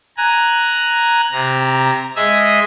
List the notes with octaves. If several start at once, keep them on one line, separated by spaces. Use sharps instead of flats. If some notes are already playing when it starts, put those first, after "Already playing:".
G#5 A#5 F#6
C3 A#5
G#3 G#4 D#5 E5 E6 G#6